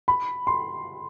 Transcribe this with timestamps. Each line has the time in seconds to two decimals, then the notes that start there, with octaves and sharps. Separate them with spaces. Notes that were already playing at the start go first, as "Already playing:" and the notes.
0.08 B5
0.47 C6